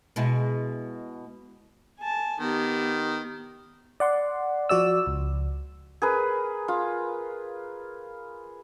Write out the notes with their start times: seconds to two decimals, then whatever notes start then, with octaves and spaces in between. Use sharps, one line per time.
0.16 B2 G#3 E4
2.00 G#5 A5
2.40 D#3 B3 G4
4.00 D5 F#5 C6
4.69 F3 F#4 D5 E6
5.07 C#2
6.02 G#4 A#4 B4
6.68 F4